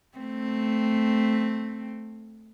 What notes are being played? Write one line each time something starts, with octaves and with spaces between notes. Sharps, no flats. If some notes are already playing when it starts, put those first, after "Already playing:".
A3 C4